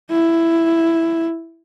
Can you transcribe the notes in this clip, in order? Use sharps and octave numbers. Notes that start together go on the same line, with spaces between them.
E4